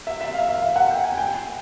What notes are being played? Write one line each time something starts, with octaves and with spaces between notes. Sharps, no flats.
E5
E5
F5
E5
F5
F#5
G5
G#5
G5